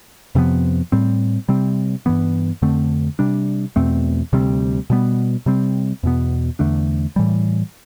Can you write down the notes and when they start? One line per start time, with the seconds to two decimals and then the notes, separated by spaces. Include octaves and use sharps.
0.35 F2 C3 F3 B3
0.92 A2 G3 C4
1.48 C3 G3 C4
2.06 G2 E3 B3
2.62 F2 D3 A3 C4
3.19 C3 G3 D4
3.76 E2 B2 A3 C4
4.33 D2 C3 G3 C4
4.90 B2 G3 B3
5.46 C3 G3 C4
6.03 E2 B2 B3
6.59 E2 D3 A3 D4
7.16 A2 E3 G3